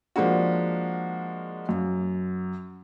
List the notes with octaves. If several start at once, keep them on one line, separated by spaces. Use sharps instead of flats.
F3 G#3 A#3 D4 F#4
F#2